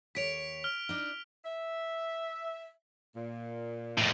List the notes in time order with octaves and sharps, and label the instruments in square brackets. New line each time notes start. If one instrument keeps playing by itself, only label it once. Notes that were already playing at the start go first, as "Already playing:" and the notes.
[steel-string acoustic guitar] D#2 C#5 [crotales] B6 D7 F7
[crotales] F6
[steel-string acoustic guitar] D4 D#4
[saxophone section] E5
A#2
[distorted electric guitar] F2 A2